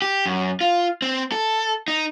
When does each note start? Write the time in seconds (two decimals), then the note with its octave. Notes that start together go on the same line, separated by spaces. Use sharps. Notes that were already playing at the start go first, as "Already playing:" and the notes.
0.02 G4
0.26 F#2
0.61 F4
1.02 C4
1.32 A4
1.88 D#4